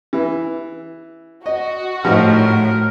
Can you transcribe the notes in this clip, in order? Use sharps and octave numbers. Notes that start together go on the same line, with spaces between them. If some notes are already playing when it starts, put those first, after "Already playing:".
E3
F#4 D#5
A2 F3 G3 D#4 A#4